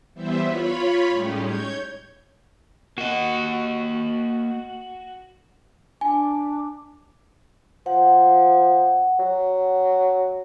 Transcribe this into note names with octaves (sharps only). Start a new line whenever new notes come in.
E3 G3 B3 C5 E5
F4 C#5 B5
A2 G3 G#3 C#4 D#4 G4
C#5 G6 G#6
A#3 F#4 D#5
D4 G#5 D6
F3 F#5
F#3